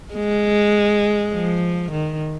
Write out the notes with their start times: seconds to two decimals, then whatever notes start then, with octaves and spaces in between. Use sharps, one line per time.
0.14 G#3
1.33 F3
1.92 D#3